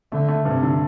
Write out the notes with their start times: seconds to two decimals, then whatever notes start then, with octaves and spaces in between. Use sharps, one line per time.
0.12 D3 A3
0.29 A3
0.45 G2 C3
0.63 D3